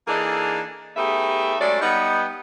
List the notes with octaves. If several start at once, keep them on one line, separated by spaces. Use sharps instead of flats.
E3 A#3 D4 D#4 G#4 A4
A3 B3 D#4 G4 G#4 E5
F#3 G#3 A3 C#4 D5
G3 B3 D#4